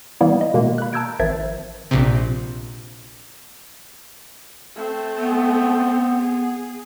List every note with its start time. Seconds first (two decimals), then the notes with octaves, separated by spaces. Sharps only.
0.21 E3 G3 A#3 B3 E4
0.41 D#5
0.54 B2 D#3 G#3 A#3
0.78 B5 F#6
0.93 A5 A#5 E6 G6 G#6 D7
1.19 G#1 D#3 F3 E5 G#6 A6
1.91 A#1 C3
4.76 A3 C4
5.18 B3
6.20 G#4